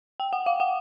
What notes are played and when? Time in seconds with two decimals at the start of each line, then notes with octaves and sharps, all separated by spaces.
0.20 G5
0.33 F#5
0.46 F5
0.60 F#5